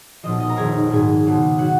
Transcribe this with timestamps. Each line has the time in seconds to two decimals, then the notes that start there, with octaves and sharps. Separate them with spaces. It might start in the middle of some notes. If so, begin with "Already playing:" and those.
0.23 B1 A#2 F3 D#5
0.40 D#5
0.49 A#4 A#5
0.56 F1 F2 D#3 G#4 G#5
0.89 A#1 G#2 F#3 G#4 G#5
1.25 C#2 B2 F#3
1.58 D#3 F#3 F#4 F#5